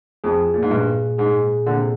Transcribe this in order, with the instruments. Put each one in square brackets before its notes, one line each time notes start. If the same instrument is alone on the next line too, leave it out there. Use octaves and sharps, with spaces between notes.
[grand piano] F2 [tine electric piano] G#4
[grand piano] A#2
G#2
[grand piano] G2 [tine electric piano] A#2
[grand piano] G#2 [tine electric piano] G#4
[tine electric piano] A#2 [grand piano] D3
[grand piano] C3